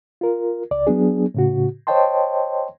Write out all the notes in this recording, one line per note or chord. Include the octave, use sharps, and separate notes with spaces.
F4 A#4
C#2 D5
F#3 B3 D4 G#4
A2 C#3 F#4
C5 C#5 D#5 G5 A5 C6